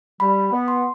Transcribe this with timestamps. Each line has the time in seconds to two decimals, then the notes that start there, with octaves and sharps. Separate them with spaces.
0.20 G3 B5
0.51 B3
0.68 C6